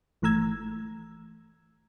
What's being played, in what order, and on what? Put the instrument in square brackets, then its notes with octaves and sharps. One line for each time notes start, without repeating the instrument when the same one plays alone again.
[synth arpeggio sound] G1 E3 A3 A#5 E6 G#6